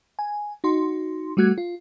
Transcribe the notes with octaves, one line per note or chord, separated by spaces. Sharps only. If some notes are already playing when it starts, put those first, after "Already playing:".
G#5
D#4 F#4 C6
G3 A3 F#4 F#6 G#6
F4